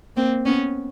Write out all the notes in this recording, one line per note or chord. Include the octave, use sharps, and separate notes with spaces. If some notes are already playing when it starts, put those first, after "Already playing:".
A#3 C4
B3 C#4